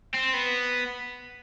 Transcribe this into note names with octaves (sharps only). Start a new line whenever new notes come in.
C4
B3